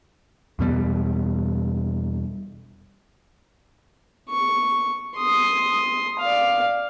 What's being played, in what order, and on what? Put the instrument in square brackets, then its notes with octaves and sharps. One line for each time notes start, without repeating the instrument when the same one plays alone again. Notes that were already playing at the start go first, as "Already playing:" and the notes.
[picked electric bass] E2 B2 G3
[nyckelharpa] C#6
C6 D#6
D5 F5